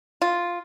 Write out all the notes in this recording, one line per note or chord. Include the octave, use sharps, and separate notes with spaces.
F4